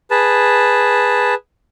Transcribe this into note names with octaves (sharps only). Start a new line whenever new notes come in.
G#4 B4 A5